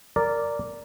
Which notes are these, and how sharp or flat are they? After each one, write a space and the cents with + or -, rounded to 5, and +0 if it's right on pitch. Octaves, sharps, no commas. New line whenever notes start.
A#4 -10 D5 -10